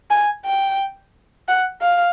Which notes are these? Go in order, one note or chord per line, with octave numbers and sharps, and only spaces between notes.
G#5
G5
F#5
F5